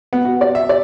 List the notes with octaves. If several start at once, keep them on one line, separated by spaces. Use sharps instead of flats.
B3
F#4
D5
E5
D5